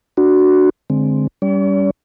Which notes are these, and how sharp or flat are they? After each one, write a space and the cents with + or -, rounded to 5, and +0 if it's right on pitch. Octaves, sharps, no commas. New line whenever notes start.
D4 +0 F#4 +0
D3 +0 G#3 +0 C4 +0
G3 +0 C#4 +30 D5 -45